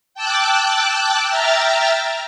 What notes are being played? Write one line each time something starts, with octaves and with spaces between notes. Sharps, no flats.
G5 A5 D6 E6 F#6
E5 G5 A#5 F6 A6